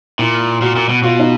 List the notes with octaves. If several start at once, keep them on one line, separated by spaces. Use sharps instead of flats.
A#2 E4
A#2 F#4
A#2
B2
B2 F4
D#4